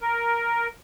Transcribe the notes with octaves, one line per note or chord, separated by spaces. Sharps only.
A#4